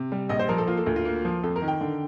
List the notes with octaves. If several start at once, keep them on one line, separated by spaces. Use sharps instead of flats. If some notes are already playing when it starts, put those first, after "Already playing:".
Already playing: C3
G3
A#1 D#5
C5
F3 A#4
A4
A#3 F4
A4
D2 F4
F4
A#3
F3
F2 A4
A#4
D#3
G5
D3